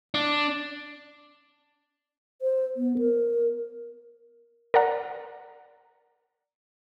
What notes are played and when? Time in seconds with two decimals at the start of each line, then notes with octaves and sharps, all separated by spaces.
0.14 D4
2.42 C5
2.77 B3
2.98 A#4
4.74 A#4 D5 F#5 A#5